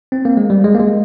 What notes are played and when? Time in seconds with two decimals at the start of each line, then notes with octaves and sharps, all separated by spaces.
0.12 C4
0.25 A#3
0.37 G#3
0.50 G3
0.64 G#3
0.75 A#3
0.80 G#3